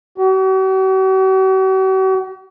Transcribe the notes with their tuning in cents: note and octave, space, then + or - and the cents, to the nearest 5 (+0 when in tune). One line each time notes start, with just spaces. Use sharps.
F#4 +45